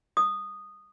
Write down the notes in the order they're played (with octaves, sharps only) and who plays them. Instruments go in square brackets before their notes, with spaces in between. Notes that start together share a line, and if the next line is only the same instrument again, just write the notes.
[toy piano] D#6